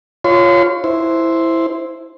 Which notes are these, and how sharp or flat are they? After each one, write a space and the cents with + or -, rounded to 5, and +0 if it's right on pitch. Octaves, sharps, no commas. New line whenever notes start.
F4 +0 C#5 +0 C6 -35
E4 +0 C5 +0